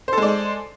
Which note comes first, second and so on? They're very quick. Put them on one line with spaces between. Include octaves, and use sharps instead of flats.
C5 A4 G#3 D5